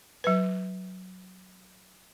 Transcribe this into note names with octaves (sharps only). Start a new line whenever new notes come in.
F#3 B4